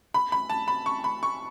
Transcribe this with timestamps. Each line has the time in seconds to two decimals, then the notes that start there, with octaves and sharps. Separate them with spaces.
0.14 B5
0.32 B5
0.50 A5
0.68 B5
0.86 C#6
1.04 B5
1.23 C#6